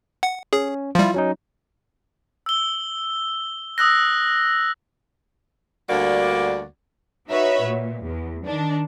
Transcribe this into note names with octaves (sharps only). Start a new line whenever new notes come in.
F#5
C#4 G#4
F3 G3 E4 F4
F#3 C#4 D#4
E6 G7
D#6 E6 F#6 A#6
D2 G3 A#3 D4 F#4 D5
D#4 F#4 B4 C#5 E5
A#2
E2
D#3 D4